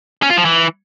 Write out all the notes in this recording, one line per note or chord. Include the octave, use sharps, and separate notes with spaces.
C#4
F4
F3
E3